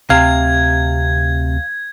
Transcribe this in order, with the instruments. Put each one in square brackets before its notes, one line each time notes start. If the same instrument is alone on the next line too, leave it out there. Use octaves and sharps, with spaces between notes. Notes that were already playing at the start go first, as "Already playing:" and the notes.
[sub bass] D2 [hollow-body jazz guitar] C3 [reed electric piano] F5 [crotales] G#6